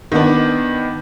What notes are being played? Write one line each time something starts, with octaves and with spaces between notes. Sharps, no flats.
D#3 B3 D4